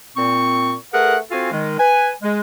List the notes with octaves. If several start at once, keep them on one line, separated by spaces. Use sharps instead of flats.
A#2 C4 C#6
A3 G#4 A#4 B4 F#5
C4 F4 F#4 A4 F5 G#5
D#3 G#3
B4 G#5
G#3